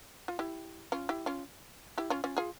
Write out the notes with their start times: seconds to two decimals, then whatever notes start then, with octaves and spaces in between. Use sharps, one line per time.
0.28 F4
0.39 E4 G4
0.92 C#4 F4
1.09 E4 G4
1.26 C#4 F4
1.98 E4 G4
2.10 C#4 F4
2.24 C#4 F4
2.37 F4 G#4